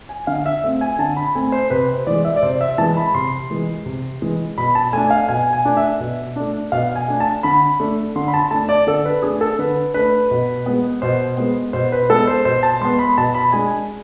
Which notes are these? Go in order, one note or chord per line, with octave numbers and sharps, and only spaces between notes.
G#5
D3 F5
E5
A3 C4 E5
G#5
D3 A5
B5
A3 C4 G#5
C5
C3 B4
C5
E3 G#3 D5
E5
D5
C3 C5
E5
E3 G#3 A5
B5
C3 C6
E3 G#3
C3
E3 G#3
B2 B5
A5
A3 D4 G#5
F5
B2 G#5
G#5
A3 D4
E5
B2
A3 D4
B2 F5
G#5
A3 D4
A5
D3 B5
A3 D4
D3 C6
B5
A5
A3 D4 A5
D5
D3 A4
B4
A3 D4 G#4
A4
D3 B4
A3 D4 B4
B2
G#3 B3
B2 C5
G#3 B3
B2 C5
B4
G#3 B3 A4
C5
B2 C5
A5
G#3 B3 C6
B5
B2 A5
B5
G#3 D4 G#5